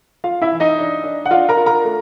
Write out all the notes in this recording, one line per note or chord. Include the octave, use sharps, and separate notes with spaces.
F4 F5
E4 E5
E3
D#4 D#5
D4
D4
F#5
D4 F4 F5
A#4 A#5
F4
A#4 A#5
A3